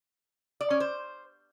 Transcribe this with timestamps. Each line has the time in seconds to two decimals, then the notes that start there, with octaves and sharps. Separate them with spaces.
0.61 D5
0.70 C#4
0.80 C5